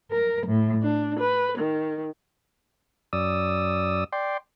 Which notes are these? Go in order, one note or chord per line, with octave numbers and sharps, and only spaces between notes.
A#4
A2
D4
B4
D#3
F#2 D5 D#6 E6
D5 G5 C6